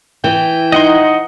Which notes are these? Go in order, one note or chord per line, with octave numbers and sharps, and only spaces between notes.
E3 G5
D#4 D#5 F#5 C6